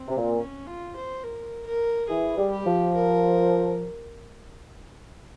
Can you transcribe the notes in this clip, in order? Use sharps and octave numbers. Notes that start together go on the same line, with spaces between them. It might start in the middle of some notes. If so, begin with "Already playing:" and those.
Already playing: C4
C3
A#2
C#4
F4
C5
A#4
A#4
E3 G#4
G3
G4
F3
A#4